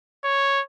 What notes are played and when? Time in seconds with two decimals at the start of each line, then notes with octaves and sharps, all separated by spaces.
0.24 C#5